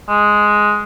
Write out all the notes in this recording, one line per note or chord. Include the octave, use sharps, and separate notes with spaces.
G#3